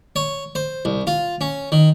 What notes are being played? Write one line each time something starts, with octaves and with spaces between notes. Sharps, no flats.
C#5
C5
C2
F4
C#4
D#3